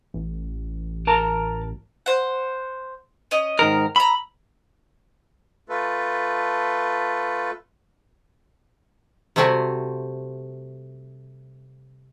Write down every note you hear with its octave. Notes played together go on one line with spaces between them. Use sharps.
A1
A#4 A5 A#5
C5 F#5
C#4 D#5
G#2 D#3 A#4
A#5 B5 E6
A3 F4 A4 B4
C3 G3 A3 C4 F#4 G#5